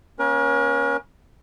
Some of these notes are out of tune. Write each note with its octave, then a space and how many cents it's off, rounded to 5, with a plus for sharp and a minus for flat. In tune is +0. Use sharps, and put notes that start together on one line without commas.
A#3 +40 C#4 +0 A#4 +45